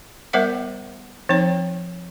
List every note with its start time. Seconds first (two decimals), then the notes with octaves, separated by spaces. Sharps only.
0.33 G3 B3 A#4 C5 E5 F#5
1.29 F3 C4 D#4 C#5